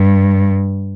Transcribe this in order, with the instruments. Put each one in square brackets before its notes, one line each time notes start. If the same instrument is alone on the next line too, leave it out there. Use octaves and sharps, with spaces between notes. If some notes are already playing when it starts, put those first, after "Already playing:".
Already playing: [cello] G2